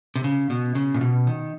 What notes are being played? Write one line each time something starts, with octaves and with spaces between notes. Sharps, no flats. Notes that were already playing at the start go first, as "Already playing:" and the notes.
C3
C#3
B2
C#3
A#2
B2
D#3